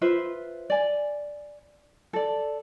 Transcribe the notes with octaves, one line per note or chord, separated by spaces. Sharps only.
F4 B4 C5 E5
D5 G#5
A4 D5